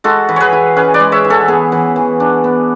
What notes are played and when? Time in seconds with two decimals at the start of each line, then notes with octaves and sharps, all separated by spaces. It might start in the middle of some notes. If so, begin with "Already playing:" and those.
0.04 G#3 F#4 A4
0.29 E3
0.36 G#4 B4 C#5
0.52 E4
0.76 C#4 G#4 B4
0.94 B4 D5
1.00 G#3
1.12 C#5 E5
1.24 E3
1.30 A4 C#5
1.48 B3 G#4
1.72 E3
1.96 E3
2.20 D4
2.44 B3